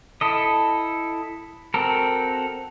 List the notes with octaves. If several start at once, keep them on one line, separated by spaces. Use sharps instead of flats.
E4 A4 D#5
C4 F#4 A4 A#4